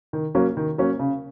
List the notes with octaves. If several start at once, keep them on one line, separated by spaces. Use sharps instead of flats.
D#3
F#3 A#3 C#4
D#3
F#3 A#3 C#4
C#3